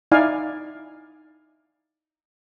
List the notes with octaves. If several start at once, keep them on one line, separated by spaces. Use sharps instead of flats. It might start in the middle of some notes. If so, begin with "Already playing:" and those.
D#4 E4 D5 F5 G#5